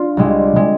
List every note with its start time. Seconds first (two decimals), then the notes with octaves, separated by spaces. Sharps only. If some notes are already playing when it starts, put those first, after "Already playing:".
Already playing: D4 F4
0.17 C2 C3 G#3
0.56 C3 G#3